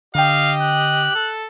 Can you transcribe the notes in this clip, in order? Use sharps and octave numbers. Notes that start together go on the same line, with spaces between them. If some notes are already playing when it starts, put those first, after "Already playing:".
D3 G4 D#5 F5 G5
F#6
A4